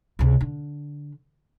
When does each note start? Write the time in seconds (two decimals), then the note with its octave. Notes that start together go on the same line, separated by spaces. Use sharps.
0.19 C#2 C3
0.41 D3